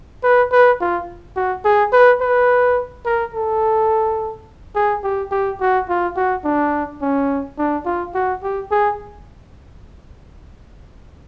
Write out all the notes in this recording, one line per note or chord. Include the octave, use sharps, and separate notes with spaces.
B4
B4
F4
F#4
G#4
B4
B4
A#4
A4
G#4
G4
G4
F#4
F4
F#4
D4
C#4
D4
F4
F#4
G4
G#4